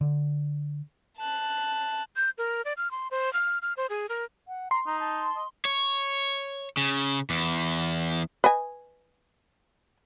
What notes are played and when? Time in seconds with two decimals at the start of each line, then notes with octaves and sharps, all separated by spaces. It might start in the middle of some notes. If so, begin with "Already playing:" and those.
0.01 D3
1.18 A5 F#6
2.16 G6
2.38 A#4
2.65 D5
2.77 F6
2.91 C6
3.11 C5
3.33 F6
3.62 F6
3.77 C5
3.90 G#4
4.09 A#4
4.48 F#5
4.71 A#5 C6
4.86 D#4 A#5
5.00 A5
5.36 D#5
5.65 C#5
6.77 C#3
7.30 E2
8.44 B4 D#5 G#5